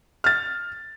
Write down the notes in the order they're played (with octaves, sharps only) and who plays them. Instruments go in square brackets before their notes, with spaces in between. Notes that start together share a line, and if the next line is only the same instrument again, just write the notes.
[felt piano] F6 A6